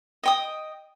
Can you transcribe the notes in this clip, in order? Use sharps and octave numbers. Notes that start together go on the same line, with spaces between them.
D#5 G5 D#6